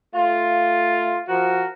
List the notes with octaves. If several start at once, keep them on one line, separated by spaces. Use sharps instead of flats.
A3 F4
F3 F#4 A#4